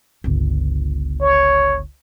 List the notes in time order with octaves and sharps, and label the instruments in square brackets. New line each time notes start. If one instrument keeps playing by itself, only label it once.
[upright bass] G1 C#2
[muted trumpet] C#5